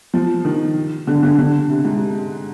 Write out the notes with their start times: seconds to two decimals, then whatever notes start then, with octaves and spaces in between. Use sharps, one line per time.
0.14 F3
0.45 D#3
1.07 D3
1.23 D3
1.38 D3
1.69 C3
1.85 G#2